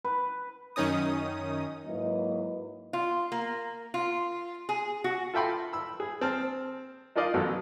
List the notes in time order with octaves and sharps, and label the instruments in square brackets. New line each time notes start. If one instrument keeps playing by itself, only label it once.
[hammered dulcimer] B4
[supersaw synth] F#2 D#3 C#4 D#4 D#6
[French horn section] G#2 F#3 A#3 E4 B4 D#5
[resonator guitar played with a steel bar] F4
A#3
F4
G#4
F#4
[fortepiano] F4 A4 E5 G5 B5 C6
B5 E6
G#4
C4 A5 F6
D#4 F4 A#4 D5 D#5 F5
A1 B2 F#3 A4